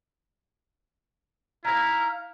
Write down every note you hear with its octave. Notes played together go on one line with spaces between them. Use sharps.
D#4 E4 F5 A#5 F6